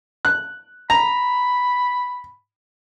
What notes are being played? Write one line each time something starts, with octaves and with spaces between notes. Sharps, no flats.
F#6
A#5 B5